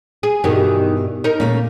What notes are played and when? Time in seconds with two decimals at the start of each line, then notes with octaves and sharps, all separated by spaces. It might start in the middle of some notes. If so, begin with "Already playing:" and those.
0.23 G#4
0.44 G2 B2 D#3 E3 G4
1.24 D#4 A#4
1.40 A#2 A3 A#3 C#4